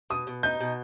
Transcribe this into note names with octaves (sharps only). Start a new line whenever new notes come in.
B2 D#6
B2
D#4 G6
B2